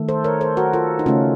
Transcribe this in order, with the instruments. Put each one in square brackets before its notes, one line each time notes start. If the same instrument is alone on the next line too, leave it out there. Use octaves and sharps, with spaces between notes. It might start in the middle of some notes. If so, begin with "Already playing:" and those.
Already playing: [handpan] D#3 A3
A4 C5
A#4 C#5
A4 C5
F#4 A#4
F4 A4
D#4
C#3 A3 C#4 F4